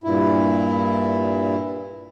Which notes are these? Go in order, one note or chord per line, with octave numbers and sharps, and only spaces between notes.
G2 A#2 E4